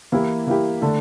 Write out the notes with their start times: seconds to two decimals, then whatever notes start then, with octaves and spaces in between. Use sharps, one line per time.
0.12 E3 A#3 E4 G4
0.47 E3 A#3 E4 G4
0.81 D3 A3 D4 A4